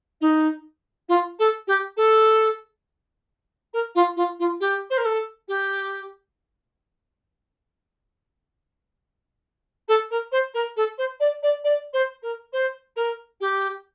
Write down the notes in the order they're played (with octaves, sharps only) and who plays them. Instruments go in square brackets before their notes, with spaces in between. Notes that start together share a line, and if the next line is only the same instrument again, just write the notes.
[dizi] D#4
F4
A4
G4
A4
A#4
F4
F4
F4
G4
C5
A#4
A4
G4
A4
A#4
C5
A#4
A4
C5
D5
D5
D5
C5
A#4
C5
A#4
G4